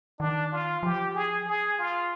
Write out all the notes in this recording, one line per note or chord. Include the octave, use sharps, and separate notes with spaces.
D#3 D4
F4
F3 G4
G#4
G#4
F4